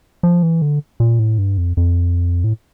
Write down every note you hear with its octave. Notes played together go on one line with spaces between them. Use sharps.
F3
E3
D3
A#2
A2
G2
F2
F2
A2